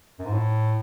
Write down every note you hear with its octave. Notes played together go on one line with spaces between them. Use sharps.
F#2
G#2
A2